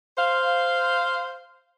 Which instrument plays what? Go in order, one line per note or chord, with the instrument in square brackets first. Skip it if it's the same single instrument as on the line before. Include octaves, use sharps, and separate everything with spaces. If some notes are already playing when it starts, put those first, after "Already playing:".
[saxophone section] C5 F5